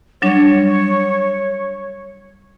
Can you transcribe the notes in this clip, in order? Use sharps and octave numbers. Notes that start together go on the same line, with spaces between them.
F#3 G3 D4 C#5